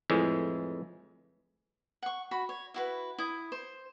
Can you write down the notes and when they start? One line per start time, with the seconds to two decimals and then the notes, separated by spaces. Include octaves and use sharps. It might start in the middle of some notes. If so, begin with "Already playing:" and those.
0.10 F2 A2 E3 G#3
2.02 F#5 C#6
2.31 F#4 B5
2.49 C#5
2.74 E4 F#4 B4
3.18 E4 D#6
3.52 C5